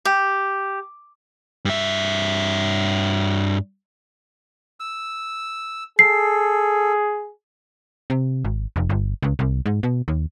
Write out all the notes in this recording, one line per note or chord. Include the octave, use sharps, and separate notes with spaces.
G4
G2 E5
E6
G#4 A4 C7
C3
G#1
F1
G1
C#2
C2
G#2
B2
D#2